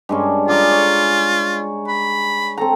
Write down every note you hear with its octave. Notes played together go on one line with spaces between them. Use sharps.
G2 G#3 C#4
F4 G#4 D5 A#5
C#5
B5
C4 A4 A#5